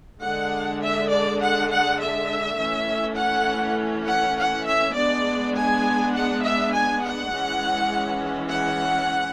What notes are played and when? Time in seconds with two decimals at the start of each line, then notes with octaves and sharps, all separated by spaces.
0.22 D3 G#3 D4 F#5
0.81 E5
1.10 D5
1.40 F#5
1.70 F#5
1.99 E5
2.59 E3 A3 C#4
3.17 F#5
4.06 F#5
4.36 F#5
4.65 E5
4.95 G#3 B3 D4 D5
5.55 G#5
6.13 F#5
6.42 E5
6.73 G#5
7.02 F#5
7.31 E3 G#3 C#4
8.49 F#5